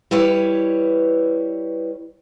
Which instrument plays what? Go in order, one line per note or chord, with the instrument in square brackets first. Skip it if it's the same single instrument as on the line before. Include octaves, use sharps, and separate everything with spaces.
[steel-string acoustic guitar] G3 E4 B4 C#5